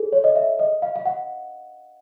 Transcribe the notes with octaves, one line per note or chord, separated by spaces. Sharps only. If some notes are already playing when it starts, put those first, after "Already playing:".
Already playing: G#4 A4
C#5
D#5
E5
D#5
F5
F5
F#5